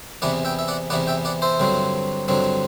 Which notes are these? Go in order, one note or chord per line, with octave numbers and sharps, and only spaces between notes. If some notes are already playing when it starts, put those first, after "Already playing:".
E2 C3 E3 B3 D5 F#5
E5 G5
E5
D5 F#5
E2 C3 E3 B3 D5 F#5
E5 G5
D5 F#5
C5 E5
G2 D3 F#3 C4
G2 D3 F#3 C4